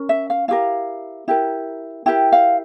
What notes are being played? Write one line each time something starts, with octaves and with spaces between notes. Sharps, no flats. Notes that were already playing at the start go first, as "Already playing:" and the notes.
Already playing: C#4 A#4
E5
F5
E4 G4 A#4 F5
E4 G4 A#4
E4 G4 A#4 G5
F5